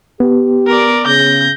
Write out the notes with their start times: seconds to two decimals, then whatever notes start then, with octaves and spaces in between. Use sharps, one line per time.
0.20 B3 G4
0.67 A#4 D5
1.07 C#3 G6 A#6